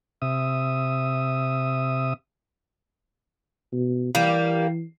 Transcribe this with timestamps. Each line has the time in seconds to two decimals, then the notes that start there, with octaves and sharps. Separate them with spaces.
0.22 C3 E5 D#6
3.73 B2
4.15 E3 G3 A#3